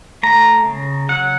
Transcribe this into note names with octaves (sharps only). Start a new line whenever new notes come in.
A3 A#5
C#3
F#3 F#5